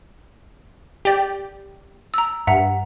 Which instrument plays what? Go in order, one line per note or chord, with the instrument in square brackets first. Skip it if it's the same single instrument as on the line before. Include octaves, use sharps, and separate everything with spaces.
[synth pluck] G4 D5
[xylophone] A#5 E6
[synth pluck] G2 [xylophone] E5 F#5 A#5